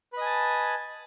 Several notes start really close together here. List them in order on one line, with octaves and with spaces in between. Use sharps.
B4 D#5 G#5 A5